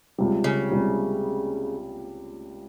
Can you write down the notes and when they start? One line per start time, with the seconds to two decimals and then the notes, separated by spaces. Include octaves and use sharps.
0.18 C#2 C3 G3
0.44 C#3
0.71 C#2 C3 G3